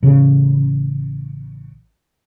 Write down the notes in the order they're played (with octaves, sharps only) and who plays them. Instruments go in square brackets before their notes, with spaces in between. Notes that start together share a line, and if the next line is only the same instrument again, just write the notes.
[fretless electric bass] A1 C#3